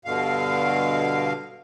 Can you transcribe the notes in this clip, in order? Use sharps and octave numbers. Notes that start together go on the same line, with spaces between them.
G2 B2 D3 F5